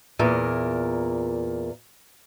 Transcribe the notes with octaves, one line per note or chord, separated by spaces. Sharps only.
E2 A#2 A#4